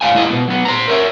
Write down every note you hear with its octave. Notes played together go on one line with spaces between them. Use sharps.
G#2 E3 C5 F5 G#5
G#3 E4 C5 D#5
B2 B3
F#3 B3
C5 A#5
A#4 C#5 E5